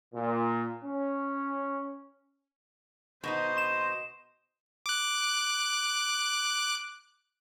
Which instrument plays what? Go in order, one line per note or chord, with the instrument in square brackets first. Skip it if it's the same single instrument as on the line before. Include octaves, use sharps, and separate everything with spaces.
[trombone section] A#2
C#4
[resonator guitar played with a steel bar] B2 B3 D#4 [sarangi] C5 [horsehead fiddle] D#5
[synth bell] C6 E7
[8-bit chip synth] D6 F#6